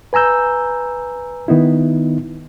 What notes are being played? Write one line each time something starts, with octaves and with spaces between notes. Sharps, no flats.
B4 G#5 A#5 E6 G6
D#3 B3 D#4 E4